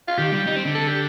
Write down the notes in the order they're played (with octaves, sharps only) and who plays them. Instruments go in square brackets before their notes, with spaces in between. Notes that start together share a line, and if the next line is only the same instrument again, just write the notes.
[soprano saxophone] F4
[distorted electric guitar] D#3 [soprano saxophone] G4
[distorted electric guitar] G3
D#4
C4
D3
[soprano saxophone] A4
G4